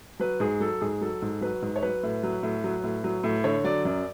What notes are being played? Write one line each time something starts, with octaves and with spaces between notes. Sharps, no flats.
F#3 B4
G#2 G#4
F#3 A4
G#2 G#4
F#3 A4
G#2
F#3 B4
G#2
C#5
F#3 B4
A2
F#3
A2
F#3
A2
F#3
A2
D3 C#5
F#3 D5
F#2 D5